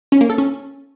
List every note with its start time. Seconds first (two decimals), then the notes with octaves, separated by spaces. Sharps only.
0.12 C#4
0.21 A#3
0.30 A4
0.38 C#4